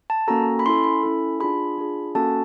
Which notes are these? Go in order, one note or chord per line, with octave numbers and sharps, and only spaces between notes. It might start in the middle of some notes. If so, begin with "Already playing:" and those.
A5
A#3 C#4 F#4 A4 A#5
B5
C#4 E4 A4 C6
B5
C#4 E4 A4
D4 F4 G#4 B5
D4 F4 G#4
A#3 C#4 F#4 A4 A5